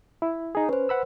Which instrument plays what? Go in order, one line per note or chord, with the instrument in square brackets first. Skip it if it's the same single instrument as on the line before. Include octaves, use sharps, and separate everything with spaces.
[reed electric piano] E4
D#4 G#4
[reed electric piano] C#4 [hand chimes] B4 C5
[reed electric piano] F#5 B5 E6